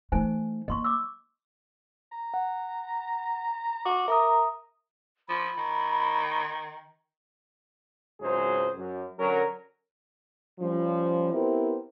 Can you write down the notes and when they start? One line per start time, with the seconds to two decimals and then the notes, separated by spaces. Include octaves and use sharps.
0.12 E3 A3 D#4 C5 G#5
0.68 A#3 D#5 C6 C#6
0.84 D6 E6
2.12 A#5
2.34 F#5
3.85 F#4 D6
4.08 A#4 E5 A#5 D#6
5.29 F3 B5
5.57 D#3
8.21 G#1 C#2 G#2 F#3 G#4 C5
8.76 F#2
9.19 D3 F#3 C#4 A#4
10.59 F3 G3 C#4
11.33 B3 C4 E4 G4 A#4 C5